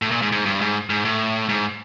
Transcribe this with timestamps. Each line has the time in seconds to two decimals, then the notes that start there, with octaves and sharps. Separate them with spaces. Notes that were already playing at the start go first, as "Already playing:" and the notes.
0.02 A2
0.11 A#2
0.22 G#2
0.32 G#2
0.46 G2
0.61 G#2
0.90 G#2
1.05 A2
1.49 G#2